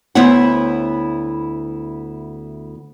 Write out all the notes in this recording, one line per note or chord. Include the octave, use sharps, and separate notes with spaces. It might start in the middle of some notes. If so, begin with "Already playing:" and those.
D2 B3 E4 C5 C#5 F#5